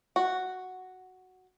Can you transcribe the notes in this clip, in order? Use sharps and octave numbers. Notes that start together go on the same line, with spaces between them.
F#4